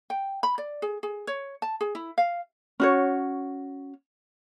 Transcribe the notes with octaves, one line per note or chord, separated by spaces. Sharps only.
G5
B5
D5
G#4
G#4
C#5
A5
G#4
E4
F5
C#4 F#4 C#5